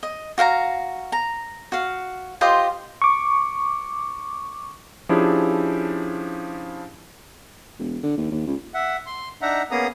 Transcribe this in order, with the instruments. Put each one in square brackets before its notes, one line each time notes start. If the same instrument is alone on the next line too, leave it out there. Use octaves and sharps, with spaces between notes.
[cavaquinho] D#5
F#4 F5 F#5 A#5
A#5
F#4 F5
F4 G4 C5 D#5
[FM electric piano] C#6 D6
[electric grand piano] F3 C#4 D4 E4 G4 G#4
[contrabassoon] E1
D3
D#2
D#2
C#2
[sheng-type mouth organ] E5 F#5
C6
D4 D#4 E5 F#5 A#5
A#3 B3 C#4 G#4 A#5 D#6